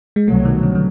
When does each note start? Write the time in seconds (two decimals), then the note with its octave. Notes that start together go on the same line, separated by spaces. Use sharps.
0.16 G#3
0.28 C2 B2 F#3 A3
0.45 D#3
0.63 D3
0.75 D3